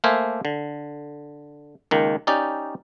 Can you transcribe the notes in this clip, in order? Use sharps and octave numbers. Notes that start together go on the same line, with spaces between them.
A3 A#3 A#4 C5 E5 G#5
D3
C#2 D#3 A#3
C#4 D#4 G4 D5